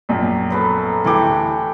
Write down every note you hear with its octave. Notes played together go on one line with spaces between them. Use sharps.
A#1 F#2
F#3 B3 A4
D1 E3 G4 A4 D6